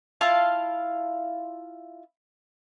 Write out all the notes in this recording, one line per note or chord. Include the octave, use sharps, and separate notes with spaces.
E4 F4 F5 A5